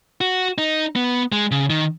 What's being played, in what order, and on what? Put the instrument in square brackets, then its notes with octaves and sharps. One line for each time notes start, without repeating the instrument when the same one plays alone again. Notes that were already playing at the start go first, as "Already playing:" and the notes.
[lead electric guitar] F#4
D#4
B3
G#3
C#3
D#3